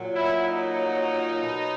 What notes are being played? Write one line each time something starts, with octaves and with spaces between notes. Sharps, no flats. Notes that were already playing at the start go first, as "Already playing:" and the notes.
Already playing: A#2 F#3
E4
D#4
B2 F#3